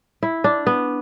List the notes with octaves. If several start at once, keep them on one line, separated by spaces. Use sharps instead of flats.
E4
D4
B3